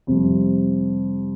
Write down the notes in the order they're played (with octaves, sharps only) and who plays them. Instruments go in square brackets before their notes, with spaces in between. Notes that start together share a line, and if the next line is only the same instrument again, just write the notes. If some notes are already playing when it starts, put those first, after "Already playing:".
[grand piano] F2 C3 G3